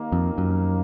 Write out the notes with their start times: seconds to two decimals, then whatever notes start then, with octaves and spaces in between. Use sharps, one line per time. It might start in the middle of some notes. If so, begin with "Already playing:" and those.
Already playing: D#2 D#3 A#3
0.12 F2
0.38 F#2